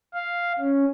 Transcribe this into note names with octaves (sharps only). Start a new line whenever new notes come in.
F5
C#4